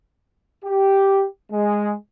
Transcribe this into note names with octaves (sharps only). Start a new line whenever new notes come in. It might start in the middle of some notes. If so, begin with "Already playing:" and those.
G4
G#3